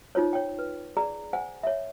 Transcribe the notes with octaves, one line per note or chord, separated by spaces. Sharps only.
D#4 F4 C5 C#5
C#5 G5
B4
G#4 D5 A#5
C5 F#5 G#5
C#5 E5